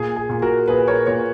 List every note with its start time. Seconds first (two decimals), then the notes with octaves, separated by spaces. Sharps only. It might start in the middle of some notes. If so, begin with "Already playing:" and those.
Already playing: A#2 G#4
0.16 G#4
0.29 A#2
0.42 F#4 A#4
0.68 A#2 G#4 B4
0.88 A#4 C#5
1.07 A#2 A#4 C#5